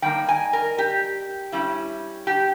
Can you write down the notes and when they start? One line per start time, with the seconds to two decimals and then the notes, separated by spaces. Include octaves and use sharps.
0.02 D#3 G3 A#3 D#4 G5
0.28 G#5
0.53 A#4
0.78 G4
1.52 G3 C#4 E4
2.27 G4